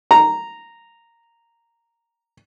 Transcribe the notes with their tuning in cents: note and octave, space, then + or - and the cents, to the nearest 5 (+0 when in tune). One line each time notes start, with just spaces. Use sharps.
A#5 -5